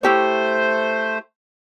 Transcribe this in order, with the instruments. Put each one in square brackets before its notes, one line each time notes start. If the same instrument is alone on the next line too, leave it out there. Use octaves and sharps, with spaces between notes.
[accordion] A3 C5 [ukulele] E4 G4 C#5